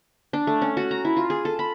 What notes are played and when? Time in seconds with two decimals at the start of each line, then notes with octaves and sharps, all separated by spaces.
0.33 D4
0.47 A3
0.62 C#4
0.77 F#4
0.91 A#5
1.05 E4
1.17 F4
1.30 G#4
1.45 A4
1.59 B5